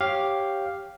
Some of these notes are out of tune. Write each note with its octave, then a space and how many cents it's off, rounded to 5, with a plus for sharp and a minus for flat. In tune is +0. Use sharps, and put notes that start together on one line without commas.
G4 +0 C#5 -15 F5 +0